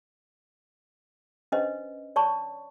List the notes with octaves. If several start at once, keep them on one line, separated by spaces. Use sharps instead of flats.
C#4 D4 B4 C5 D#5
C#5 D5 A5 C#6